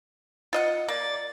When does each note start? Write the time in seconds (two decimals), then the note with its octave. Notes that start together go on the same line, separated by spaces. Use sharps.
0.53 F4 D#5 F#5
0.88 A#3 D5 A6